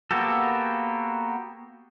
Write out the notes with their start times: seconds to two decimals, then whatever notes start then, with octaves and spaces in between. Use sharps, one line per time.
0.11 A#3 B3 F#4 G4 A4